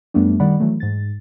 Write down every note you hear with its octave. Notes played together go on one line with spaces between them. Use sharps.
F#2 G3 A3 B3 D4
D#3 G3 D5 F#5 B5
E3 F#3 A3
G#2 A6